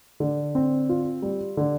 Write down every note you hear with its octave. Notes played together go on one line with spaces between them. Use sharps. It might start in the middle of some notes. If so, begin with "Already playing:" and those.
D3
C4
F4
G3
D3